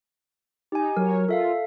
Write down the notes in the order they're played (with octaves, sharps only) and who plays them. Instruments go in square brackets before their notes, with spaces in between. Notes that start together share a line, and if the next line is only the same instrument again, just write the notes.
[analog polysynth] D#4 [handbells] G4 G#5
[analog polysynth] F#3 C#5 [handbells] A#4
[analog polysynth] F4 [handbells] A4 E5 F5